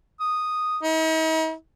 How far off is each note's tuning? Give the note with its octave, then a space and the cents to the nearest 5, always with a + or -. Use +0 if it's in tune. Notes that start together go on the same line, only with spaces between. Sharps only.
D#6 -5
D#4 +45